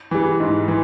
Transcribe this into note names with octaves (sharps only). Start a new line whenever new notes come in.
E3 G3
G#2
E3